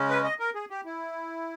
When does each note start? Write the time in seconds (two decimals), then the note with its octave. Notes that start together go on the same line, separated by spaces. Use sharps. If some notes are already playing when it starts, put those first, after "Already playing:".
Already playing: C#3 G#3 C#4
0.09 B4
0.24 D#5
0.39 A#4
0.55 G#4
0.70 G4
0.85 E4